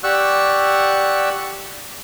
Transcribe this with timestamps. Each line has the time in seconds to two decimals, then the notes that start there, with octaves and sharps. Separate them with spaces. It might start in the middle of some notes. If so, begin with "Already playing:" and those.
0.04 G4 D5 F#5 C#6 E6 F#6